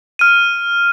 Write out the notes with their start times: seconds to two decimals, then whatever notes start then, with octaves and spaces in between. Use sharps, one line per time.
0.19 F6 D#7